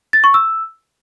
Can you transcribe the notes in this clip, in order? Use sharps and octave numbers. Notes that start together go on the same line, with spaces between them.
A6
C#6
E6